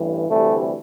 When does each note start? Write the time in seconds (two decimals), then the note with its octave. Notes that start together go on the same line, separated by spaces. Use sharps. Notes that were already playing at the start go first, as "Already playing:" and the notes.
Already playing: A1 G2 E3
0.29 D2 C3 E3 G3 A3